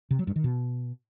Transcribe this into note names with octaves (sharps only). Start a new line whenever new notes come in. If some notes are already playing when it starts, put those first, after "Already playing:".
C3
F#3
G2
D#3
B2